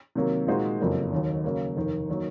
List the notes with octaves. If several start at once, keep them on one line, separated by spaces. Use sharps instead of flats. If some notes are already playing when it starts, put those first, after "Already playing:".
C3 D#3 F#3 A#3
A#2 G#3 D#4 F#4 C5
F#1 F2 C#3 F#3 A#3
D#2 D#3 F#3
C#3 F#3 A#3
F1 D#2 D#3
D#3 F#3 A#3